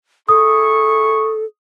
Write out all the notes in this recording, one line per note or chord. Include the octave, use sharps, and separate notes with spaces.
E4 G#4 A4 C#6 D#6